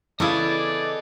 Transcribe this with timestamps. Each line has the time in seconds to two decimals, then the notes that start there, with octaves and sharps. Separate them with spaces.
0.20 C#3 E3 E4 G#4 A4 D5 D#5 B5